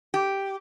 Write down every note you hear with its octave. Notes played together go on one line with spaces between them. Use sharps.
G4